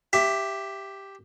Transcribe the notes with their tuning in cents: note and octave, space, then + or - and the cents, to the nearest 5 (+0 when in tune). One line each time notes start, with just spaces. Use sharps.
G4 +0 E5 +15